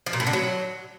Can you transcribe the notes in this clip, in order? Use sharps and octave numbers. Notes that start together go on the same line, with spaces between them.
F3
A#2
A2
D3
F#3